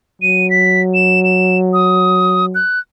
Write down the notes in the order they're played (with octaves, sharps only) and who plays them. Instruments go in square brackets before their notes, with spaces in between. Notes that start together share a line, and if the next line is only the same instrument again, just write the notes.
[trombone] F#3 [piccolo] D#7
[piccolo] B6
E7
E7
D#6
F#6